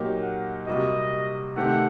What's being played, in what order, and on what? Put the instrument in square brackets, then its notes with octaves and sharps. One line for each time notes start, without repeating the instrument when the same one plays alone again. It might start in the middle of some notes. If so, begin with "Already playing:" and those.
Already playing: [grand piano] A#2 F#3 A#3 D#4 G4
[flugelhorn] F#5
[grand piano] C3 G3 A#3 F#4 [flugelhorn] D#5
[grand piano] C3 D#3 A3 C4 G4 [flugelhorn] F#5